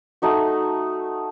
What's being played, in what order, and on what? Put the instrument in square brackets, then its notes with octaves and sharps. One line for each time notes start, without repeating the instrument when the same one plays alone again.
[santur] A3 D#4 F#4